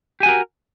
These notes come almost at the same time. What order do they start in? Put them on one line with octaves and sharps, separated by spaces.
G4 G#5 F#4 A#4